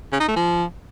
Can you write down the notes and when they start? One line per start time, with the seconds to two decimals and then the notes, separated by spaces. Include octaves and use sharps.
0.12 C#3
0.20 D#4
0.28 A3
0.36 F3